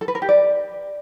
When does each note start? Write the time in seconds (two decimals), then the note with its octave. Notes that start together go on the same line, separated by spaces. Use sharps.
0.01 A4
0.08 B4
0.15 A#4
0.22 G4
0.29 D5